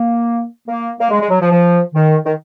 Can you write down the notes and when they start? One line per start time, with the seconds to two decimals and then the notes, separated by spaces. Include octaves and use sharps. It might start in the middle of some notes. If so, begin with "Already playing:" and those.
Already playing: A#3
0.68 A#3
1.00 A#3
1.10 G#3
1.21 G#3
1.30 F#3
1.41 F3
1.51 F3
1.94 D#3
2.25 D#3